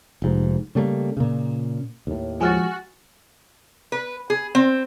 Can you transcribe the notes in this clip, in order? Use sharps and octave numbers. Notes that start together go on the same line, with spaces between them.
F1 G#2
C#3 G3 A3 A#3
A#2 C#3
D#2 A2
F3 G#3 F#4 G#4 G#5 F6 A6
B4
G#4
C4